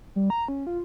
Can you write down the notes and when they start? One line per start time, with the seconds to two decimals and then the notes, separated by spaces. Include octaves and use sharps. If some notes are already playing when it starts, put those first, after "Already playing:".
0.16 G3
0.30 A#5
0.48 C#4
0.67 F4